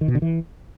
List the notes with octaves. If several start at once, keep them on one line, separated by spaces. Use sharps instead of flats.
D#3
B2
D3
E3